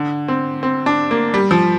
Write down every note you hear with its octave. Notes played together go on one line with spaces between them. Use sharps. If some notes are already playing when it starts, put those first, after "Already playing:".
Already playing: D3
C4
C4
D4
A#3
G3
F3